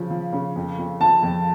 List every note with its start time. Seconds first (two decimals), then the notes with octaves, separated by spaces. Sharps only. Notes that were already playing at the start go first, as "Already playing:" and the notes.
Already playing: C#3 F3 C#4
0.10 F3
0.33 C#3
0.56 F2
0.78 F2
1.01 F3 A5
1.23 F2